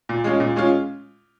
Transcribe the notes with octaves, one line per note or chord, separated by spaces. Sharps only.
A#2
G#3 C#4 F4
A#2
G#3 C#4 F4